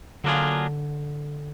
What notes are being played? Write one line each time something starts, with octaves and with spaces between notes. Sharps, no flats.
D3 F#3 A#3 D4 F4 G#4